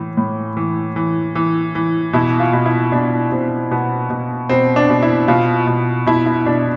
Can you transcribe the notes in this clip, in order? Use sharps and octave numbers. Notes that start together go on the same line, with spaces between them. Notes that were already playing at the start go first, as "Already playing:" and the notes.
Already playing: A2 E3
A2
E3
E3
E3
E3
B2 E4
F4
B2
E4
B2 D4
B2 C4
B2 B3
B2
B2 C4
D4
B2
E4
B2 F4
B2
B2 E4
E4
B2 D4